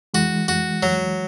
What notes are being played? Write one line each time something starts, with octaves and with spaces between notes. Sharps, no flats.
E3 G#3 F#4
F#4
F#3